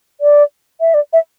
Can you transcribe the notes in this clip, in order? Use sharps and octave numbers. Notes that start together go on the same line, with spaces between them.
D5
E5
D5
E5